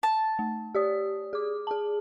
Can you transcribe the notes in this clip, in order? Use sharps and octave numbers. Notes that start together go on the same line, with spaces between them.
A5
A3
G4 D5 D#6
G#4 D6
G#4 A5